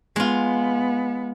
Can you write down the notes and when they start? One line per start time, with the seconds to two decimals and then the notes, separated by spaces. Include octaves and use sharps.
0.16 G#3 B3 F4